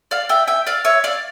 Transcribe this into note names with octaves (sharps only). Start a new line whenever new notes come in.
D5 F5
E5 G5
E5 G5
D5 F5
C#5 E5
D5 F5